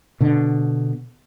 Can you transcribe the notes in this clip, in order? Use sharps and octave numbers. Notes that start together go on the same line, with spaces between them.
B2 D3